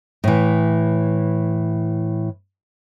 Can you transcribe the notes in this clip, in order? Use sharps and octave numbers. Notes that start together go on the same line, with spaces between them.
A2 E3